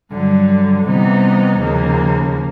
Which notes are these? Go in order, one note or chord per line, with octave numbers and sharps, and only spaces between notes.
G2 D3 F#3
C3 E3 G3 B3 D#4
D#2 C#3 F3 A#3